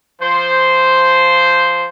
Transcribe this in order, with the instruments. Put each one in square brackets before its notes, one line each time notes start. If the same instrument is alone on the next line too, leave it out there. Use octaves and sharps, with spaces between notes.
[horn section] F3 C5